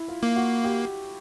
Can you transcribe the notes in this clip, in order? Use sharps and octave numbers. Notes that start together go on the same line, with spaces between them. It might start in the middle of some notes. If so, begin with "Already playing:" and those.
Already playing: E4
F4
A#3
F#4
G4